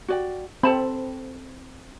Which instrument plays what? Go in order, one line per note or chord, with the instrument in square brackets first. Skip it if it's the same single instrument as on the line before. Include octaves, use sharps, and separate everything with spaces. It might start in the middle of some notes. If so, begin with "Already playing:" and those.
[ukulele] F#4 D5 G5
[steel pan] C4 [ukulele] A4 A5 B5